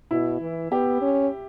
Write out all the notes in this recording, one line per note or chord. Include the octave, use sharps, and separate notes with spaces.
B2 E4
E3
B3 G4
C#4